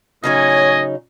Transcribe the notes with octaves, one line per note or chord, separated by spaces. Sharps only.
A2 C#3 F#3 D#4 C#5 D#5 G#5